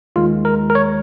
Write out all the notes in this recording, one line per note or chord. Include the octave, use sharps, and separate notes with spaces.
D#2 D#3 G#3 F4
A#4
A#4
C#5